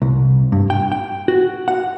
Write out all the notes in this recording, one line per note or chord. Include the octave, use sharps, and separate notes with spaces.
C2
G2
G5
G5
F#4
F#5